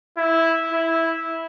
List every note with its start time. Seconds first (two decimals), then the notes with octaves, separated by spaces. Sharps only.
0.17 E4
0.73 E4